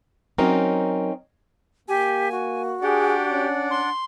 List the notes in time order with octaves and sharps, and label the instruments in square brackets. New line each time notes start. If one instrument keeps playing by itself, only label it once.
[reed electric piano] F#3 A#4 [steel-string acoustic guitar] C4 C#4 D#4
[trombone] A#3 [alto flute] G4 [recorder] G#5
[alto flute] F#4
[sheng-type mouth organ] D4 D5 F#5 [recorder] G4 [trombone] G#4
[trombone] C#4
[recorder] C6